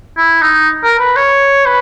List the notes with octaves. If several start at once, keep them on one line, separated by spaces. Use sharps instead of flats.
E4
D#4
A#4
B4
C#5
B4